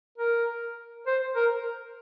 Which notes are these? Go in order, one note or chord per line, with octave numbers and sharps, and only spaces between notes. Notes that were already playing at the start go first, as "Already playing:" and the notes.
A#4
C5
A#4